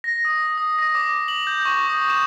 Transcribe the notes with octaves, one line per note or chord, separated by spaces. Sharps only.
A#6
D#6
D#6
A#6
D6
F#7
G6
C#6
D#6
E7